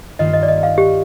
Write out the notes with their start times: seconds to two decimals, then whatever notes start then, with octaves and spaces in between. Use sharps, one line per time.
0.19 G2 D#3 A#3 F4 D#5
0.34 D#5
0.43 D5
0.48 D#5
0.63 F5
0.78 G4